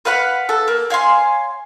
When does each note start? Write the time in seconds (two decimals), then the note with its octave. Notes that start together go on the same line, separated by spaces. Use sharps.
0.05 B4 F5 F#5 B5
0.49 A4
0.68 A#3
0.90 C#5 F5 G#5 C6